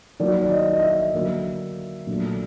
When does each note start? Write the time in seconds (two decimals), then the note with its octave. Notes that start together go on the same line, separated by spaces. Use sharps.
0.20 D#3 F#3 A#3 D5
0.42 D5
0.51 D#5
0.73 D#5
0.83 E5
1.13 D3 F#3 A#3
2.07 A#2 F#3 A3 D4